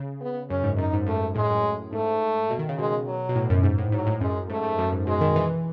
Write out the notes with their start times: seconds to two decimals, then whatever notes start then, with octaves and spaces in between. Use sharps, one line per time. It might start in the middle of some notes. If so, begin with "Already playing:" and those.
Already playing: C#3
0.21 B3
0.50 F#2 C#4
0.64 G#2
0.78 F#2 D#4
0.93 G#2
1.07 F#2 A3
1.36 A2 G#3
1.50 F#2
1.92 G#2 A3
2.50 B2
2.59 D#3
2.69 C#3
2.78 B2 G#3
3.07 F#3
3.29 B2
3.35 A2
3.50 F#2
3.63 G#2
3.78 A2
3.92 G#2 F#3
4.07 A2
4.21 F#2 G#3
4.49 G#2 A3
4.63 G#2
4.78 F#2
4.93 G#2
5.07 B2 G#3
5.21 D#3
5.36 E3